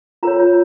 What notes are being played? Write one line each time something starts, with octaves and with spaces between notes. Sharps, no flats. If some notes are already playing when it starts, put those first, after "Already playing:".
F4 A#4 C#5 A#5
C#5